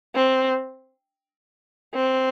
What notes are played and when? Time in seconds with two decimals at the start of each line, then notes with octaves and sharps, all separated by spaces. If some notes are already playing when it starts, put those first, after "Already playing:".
0.16 C4
1.94 C4